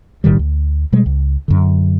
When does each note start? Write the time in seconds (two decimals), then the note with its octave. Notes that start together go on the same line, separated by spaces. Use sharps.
0.24 B1 A2 D#3 G3
0.39 D2
0.92 B2 G3 G#3
1.06 C#2
1.48 F#2 D3